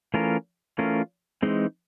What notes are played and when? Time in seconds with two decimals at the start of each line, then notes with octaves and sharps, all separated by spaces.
0.14 E3 A3 C#4 F4 A#4
0.78 E3 A3 C#4 F4 A#4
1.42 E3 G#3 C4 D#4